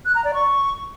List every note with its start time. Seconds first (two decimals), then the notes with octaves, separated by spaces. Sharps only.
0.05 F#6
0.15 A#5
0.24 D5
0.34 C#6